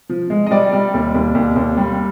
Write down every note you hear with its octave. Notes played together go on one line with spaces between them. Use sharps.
F3
G#3
D#5
G3 D5
G3
D#2
D#2
D#2
D#2
G3